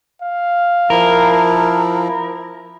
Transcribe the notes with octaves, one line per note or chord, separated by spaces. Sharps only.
F5
F3 E4 A#4